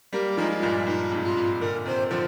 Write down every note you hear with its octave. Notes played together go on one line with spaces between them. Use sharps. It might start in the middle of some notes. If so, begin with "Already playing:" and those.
G3 A#3 G4
F3 G#3 D#4
F4
G2 A#2
G2 A#2 D#4
G#2 C3
F4
G#2 C3
A#2 D3 A#4
C3 D#3 C5
D3 F3 C5